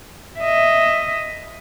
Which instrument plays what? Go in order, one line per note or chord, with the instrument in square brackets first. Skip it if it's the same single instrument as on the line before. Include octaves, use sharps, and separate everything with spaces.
[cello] D#5 E5